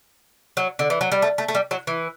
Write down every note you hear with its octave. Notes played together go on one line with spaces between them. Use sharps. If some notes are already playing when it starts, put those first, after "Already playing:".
F#3
D3
E3
F#3
G3
A3
A3
A3
G3
F#3
E3